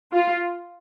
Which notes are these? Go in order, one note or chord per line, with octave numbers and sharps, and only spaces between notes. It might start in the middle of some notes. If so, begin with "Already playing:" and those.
F4